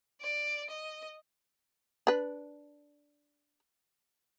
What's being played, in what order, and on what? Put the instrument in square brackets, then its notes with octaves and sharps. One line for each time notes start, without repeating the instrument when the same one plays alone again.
[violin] D5
D#5
[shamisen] D4 B4